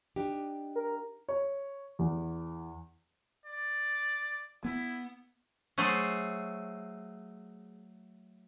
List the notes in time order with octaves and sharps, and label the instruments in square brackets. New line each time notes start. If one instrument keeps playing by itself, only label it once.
[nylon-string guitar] D4 D#4 G4
[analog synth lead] A#4
[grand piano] C#5
E2
[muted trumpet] D5
[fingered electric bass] B3 [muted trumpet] E4
[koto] F#3 A3 G#4 C5